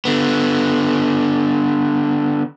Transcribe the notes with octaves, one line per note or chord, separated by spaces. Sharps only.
D3 B3